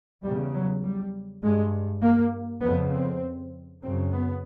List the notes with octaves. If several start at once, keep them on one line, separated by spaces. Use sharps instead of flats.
E2 C#3 G3
F#3
G3
G2 G#3
A#3
F2 C#3 B3
C4
F#2 C#3 C4
B3